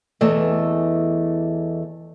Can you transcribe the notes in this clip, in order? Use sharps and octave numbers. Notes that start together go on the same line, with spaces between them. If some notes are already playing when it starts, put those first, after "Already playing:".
E2 E3 A3 D#5